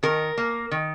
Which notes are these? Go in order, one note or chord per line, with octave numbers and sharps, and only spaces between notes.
D#3 A#4
A#3
D#3